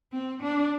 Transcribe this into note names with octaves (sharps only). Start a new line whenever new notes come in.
C4
D4